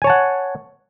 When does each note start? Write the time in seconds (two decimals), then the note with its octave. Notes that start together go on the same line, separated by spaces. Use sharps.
0.02 G#5
0.04 C#5
0.07 A5
0.10 F#5